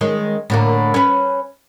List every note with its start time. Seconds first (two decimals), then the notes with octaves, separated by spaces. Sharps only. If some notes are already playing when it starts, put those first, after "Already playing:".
0.01 D#3 G#3 C#4
0.50 A2 D3 A#3
0.94 C#4 B4